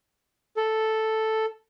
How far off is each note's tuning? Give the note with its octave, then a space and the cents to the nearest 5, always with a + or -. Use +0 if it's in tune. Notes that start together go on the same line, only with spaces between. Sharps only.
A4 +0